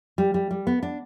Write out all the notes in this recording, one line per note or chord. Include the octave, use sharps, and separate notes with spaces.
G3
G3
G3
B3
D4